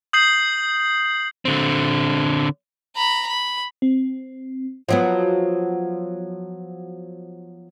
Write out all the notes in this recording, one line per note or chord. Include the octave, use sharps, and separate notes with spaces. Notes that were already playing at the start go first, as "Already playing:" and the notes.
D#6 G6 C7 F#7
D3 C4
A#5 B5
B5
C4
F3 F#3 B3